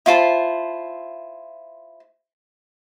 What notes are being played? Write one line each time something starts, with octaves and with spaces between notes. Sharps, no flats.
E4 F4 C5 A5